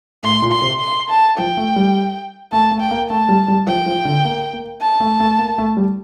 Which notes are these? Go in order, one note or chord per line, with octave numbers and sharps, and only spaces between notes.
A2 C6
A#2
C6
C3
C6
A5
F3 G5
A3
G3
A3 A5
A3
G5
A#3
A3 A5
G3
G3
F3 G5
F3
D3
A#3
A#3
A5
A3
A3
A#3
A3
G3